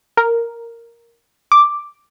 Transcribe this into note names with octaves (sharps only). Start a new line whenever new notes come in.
A#4
D6